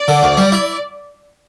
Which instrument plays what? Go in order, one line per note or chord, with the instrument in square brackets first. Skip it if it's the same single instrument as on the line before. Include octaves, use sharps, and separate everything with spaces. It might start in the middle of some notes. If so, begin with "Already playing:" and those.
Already playing: [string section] D5
[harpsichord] D3
D2
G3
E4